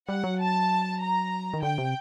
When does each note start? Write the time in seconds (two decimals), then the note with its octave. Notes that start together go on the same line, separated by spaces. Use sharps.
0.09 G3 F#5
0.24 F#3
0.39 A5
1.01 A#5
1.54 D#3
1.62 D3 G5
1.78 C3